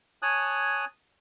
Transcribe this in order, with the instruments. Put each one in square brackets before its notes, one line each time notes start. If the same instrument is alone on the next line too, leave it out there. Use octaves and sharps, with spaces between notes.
[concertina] C#5 G#5 A5 D#6 F#6